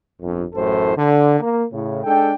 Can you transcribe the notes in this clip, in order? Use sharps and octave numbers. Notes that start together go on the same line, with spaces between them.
G1 F2
A1 F#2 A2 A4 C5
D3
A#3
A2 C#3
G#3 D4 A4 G5